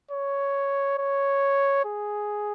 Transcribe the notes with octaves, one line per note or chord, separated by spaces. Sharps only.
C#5
C#5
G#4